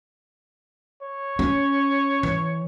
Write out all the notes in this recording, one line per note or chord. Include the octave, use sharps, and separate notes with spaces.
C#5
C#4
E3